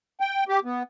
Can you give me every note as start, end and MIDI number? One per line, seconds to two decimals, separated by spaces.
0.20 0.44 79
0.49 0.60 67
0.65 0.83 59